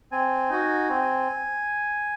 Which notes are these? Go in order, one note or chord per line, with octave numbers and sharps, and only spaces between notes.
C4 G#5
D#4 F#4
C4